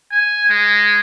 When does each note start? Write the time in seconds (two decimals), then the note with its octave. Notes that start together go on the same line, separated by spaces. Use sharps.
0.11 G#5
0.50 G#3